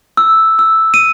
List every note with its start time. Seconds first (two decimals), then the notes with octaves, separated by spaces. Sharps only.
0.17 E6
0.59 E6
0.94 D#7